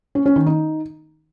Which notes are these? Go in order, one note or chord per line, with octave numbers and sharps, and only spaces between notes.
C#4
C#4
D#3
D#4